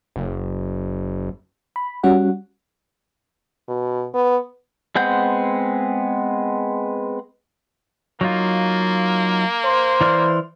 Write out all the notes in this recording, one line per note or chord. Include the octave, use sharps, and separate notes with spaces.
F#1
B5
G3 C#4 F#4 F#5
B2
B3
G#3 B3 C4 F#5 G6
F#3 A#3 D#4 F4
C5 C6
E3 D5 F6